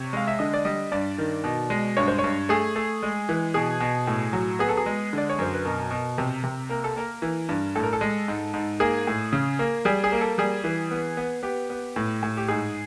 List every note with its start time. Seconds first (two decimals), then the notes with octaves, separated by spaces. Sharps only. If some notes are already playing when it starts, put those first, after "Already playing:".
Already playing: C3 C#5
0.13 G#3 F5
0.28 E5
0.39 D3 D#5
0.54 D5
0.65 G3 D#5
0.92 G2 D5
1.18 D#3
1.44 B2
1.70 G#3
1.97 G2 C#5
2.08 C5
2.19 C#5
2.24 G2
2.49 A3 G#4
2.76 A3
3.03 G#3
3.29 E3
3.54 B2 G#4
3.80 B2
4.07 A2
4.33 F#3
4.59 B3 G#4
4.69 A4
4.77 G#4
4.86 G#3
5.13 D3 D5
5.30 C#5
5.39 F#2 C5
5.54 B4
5.65 B2 A#4
5.91 B2
6.18 C3
6.44 C3
6.69 A#3 A#4
6.84 A4
6.96 A#3 A#4
7.22 E3
7.49 G2
7.75 A2 A4
7.83 A#4
7.93 A4
8.01 G#3
8.28 G#2
8.54 G#2
8.80 A#3 G#4
9.07 A2
9.33 C#3
9.59 A#3
9.85 G3 G#4
10.04 G#4
10.12 A#3
10.21 A4
10.38 G3 G#4
10.64 E3
10.91 B3
11.17 B3
11.43 B3 G4
11.70 B3
11.96 A2
12.23 A2
12.37 G4
12.48 G#2 G#4